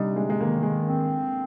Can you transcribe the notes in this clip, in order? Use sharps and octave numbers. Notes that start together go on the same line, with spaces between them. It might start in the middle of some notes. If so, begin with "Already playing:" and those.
Already playing: C3 G3 D4 D#4
G#3
G#3
D#3 A#3
G#3
C4